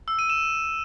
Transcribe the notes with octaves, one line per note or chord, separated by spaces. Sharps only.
E6
D#7
E7